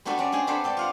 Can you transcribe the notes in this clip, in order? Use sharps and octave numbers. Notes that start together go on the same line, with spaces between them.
G3 B3 D4 F#4 A4
C4 C#4 D5
D4 G4 G#4 G#5
B3 C4 D4 A4 B4 C5
G4 A4 D5
F4 F5 F#5